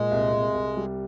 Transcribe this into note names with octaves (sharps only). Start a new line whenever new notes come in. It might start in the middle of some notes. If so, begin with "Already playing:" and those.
Already playing: A#2 G#3
C2
C2
C2
G3